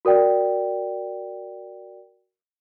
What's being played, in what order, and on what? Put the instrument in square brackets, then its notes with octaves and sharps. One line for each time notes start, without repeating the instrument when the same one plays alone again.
[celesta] F#4 A#4 D5 G5